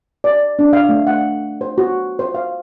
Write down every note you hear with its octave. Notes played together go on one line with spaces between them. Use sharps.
D5
D4
F5
A3
F#5
C5
F#4
C5
F5